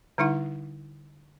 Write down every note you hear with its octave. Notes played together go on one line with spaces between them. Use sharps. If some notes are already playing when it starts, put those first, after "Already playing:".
D3 G3 D#4 E4 F#5